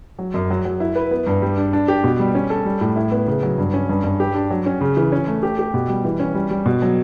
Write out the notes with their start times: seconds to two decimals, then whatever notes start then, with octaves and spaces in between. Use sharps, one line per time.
0.19 F#3
0.34 F#2
0.50 F#3
0.65 F#3
0.80 E4
0.96 B4
1.11 B3
1.27 G2
1.42 G3
1.58 D4
1.73 D4
1.88 G4
2.04 B2
2.20 G3
2.35 C#4
2.50 A4
2.65 G3
2.81 A2
2.96 E4
3.12 B3
3.27 C#3
3.43 F#3
3.58 G2
3.74 C#4
3.89 G2
4.04 G2
4.20 G4
4.35 D4
4.50 F#3
4.66 C#4
4.81 C#3
4.97 E3
5.12 C#4
5.27 A3
5.43 G4
5.59 G4
5.74 B2
5.89 G3
6.05 E3
6.20 C#4
6.35 G3
6.51 G3
6.66 B2
6.82 F#3